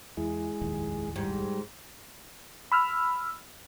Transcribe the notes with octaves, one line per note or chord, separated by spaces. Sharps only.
E2 G#3 E4
F1 A#1 D#2
G#2 G3
B5 E6 F6